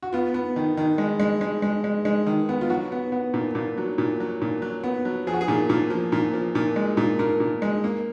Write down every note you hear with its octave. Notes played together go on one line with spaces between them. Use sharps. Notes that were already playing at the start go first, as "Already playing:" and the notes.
F#4
B3 F4
B3
D#3
D#3
G#3
G#3
G#3
G#3
G#3
G#3
D#3
B3
F4
F#3 F#4
B3
B3
A#2
A#2
F#3
A#2
F#3
A#2
F#3
B3
F#3
F3 G#4
F#4
G#4
A#2
A#2
F3
A#2
F3
A#2
G#3
A#2
A#2 A#4
A#2
G#3
A#3